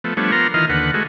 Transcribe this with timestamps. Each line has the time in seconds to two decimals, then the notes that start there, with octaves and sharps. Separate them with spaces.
0.04 F3 A3 B3
0.17 F3 G3 A3 B3 D4 C#5
0.32 F3 B3 A#4 A#5 C6
0.54 D#3 E3 F4 D#5 F6
0.69 D#2 D3 B4 F#5
0.94 G#3 A3 F#4